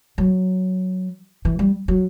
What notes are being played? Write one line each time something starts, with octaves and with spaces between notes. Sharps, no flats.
F#3
E3
G3
F#3